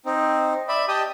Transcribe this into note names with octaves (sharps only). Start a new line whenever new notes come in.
C4 D#4
D5 E5 B5
G4 D#5 G5 A5 D#6